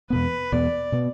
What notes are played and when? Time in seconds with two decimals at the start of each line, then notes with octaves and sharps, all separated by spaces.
0.10 E2 B2 B3 B4
0.52 E2 B2 B3 D5
0.92 B2 B3